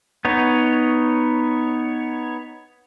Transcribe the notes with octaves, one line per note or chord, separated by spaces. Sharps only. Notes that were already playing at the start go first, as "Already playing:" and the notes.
B3 D#4 C#5